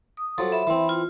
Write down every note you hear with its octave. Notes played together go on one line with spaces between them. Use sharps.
D#6
F3 F#3 A4
E5 B5
E3 C4
F4